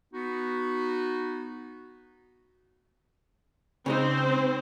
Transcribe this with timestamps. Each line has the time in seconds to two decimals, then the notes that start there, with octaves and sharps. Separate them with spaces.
0.13 B3 D#4 F#4
3.86 C#3 G#3 C4 D#4 C5